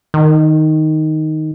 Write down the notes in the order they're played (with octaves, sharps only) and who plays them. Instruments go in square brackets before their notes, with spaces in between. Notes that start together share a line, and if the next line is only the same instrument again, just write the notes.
[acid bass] D#3